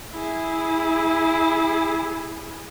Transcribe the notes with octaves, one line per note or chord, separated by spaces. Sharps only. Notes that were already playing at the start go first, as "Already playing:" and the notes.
E4 G#4